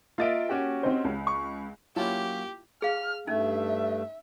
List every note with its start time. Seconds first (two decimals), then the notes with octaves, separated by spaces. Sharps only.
0.18 A#3 F4 D#5 E5 A6 D7
0.49 C#4 F#4 G4
0.83 C4 D#4 C5
1.04 C#2
1.27 C#6
1.96 F#3 A#3 C#4 E4 F4 G4 A5
2.82 G#4 F5 F6
3.27 G2 A3 C#4 D#4 E5